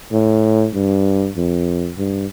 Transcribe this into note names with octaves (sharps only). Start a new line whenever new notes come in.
A2
G2
F2
G2